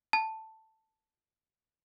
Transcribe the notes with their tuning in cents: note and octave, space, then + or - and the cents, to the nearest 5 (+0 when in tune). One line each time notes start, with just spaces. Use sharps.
A5 +5